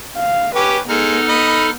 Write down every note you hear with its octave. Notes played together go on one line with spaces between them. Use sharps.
F5
C#4 G4 B4 G5 D6
G#3 B3 D#4 A4 F6
D#5 B5